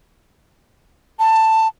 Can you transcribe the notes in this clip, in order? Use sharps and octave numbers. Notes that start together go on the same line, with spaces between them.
A5